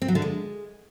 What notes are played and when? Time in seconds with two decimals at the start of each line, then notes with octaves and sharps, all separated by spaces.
0.02 C4
0.08 F#3
0.15 D3
0.22 G#3